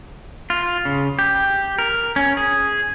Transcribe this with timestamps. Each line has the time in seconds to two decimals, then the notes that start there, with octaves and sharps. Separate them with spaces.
0.50 F4
0.85 C#3
1.19 G4
1.79 A#4
2.16 C#4
2.37 G#4